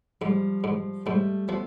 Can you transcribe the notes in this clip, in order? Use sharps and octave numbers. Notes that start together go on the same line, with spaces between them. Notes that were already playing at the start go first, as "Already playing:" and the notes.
G#2 F3 G3
G#2
G#2 G3 A3
F3 A3 B3